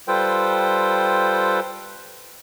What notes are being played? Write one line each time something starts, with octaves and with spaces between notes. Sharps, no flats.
G3 F4 A4 B4 C5 G5